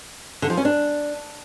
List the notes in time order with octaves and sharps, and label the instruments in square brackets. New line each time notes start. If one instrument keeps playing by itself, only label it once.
[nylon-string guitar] D3
F3
C#4
D4